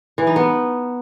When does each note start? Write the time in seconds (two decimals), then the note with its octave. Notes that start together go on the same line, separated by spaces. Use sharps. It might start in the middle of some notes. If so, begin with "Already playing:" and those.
0.18 E3
0.27 D#4
0.36 B3